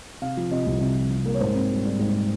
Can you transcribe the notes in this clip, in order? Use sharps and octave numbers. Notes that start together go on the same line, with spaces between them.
C3 F5
F3
C3 D#5
C2
C3
F3
C3
A#3
C#5
G#2 C5
C4
G3
G3
G#2